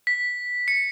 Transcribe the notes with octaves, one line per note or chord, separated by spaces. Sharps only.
B6
C#7